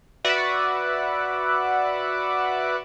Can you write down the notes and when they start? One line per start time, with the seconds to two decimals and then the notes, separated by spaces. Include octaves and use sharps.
0.24 F#4 B4 D5 E5 F#5